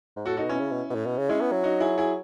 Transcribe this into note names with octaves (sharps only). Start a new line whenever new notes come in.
G#2
A2 F#4 A4
D#4 F#4
B2
C#4 E4
C#3
B2
B2
A2
B2
C#3
G#3 C#4 E4
B3
F#3
D#4 F#4
E4 G#4
E4 G#4